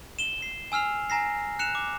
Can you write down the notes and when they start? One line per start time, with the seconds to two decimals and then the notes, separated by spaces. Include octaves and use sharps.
0.19 E7 G7
0.42 C7
0.72 G#5 E6 F6 C7 F7
1.10 G#5 A#5 A#6 C7
1.59 F#6 C#7 E7 F7
1.75 D6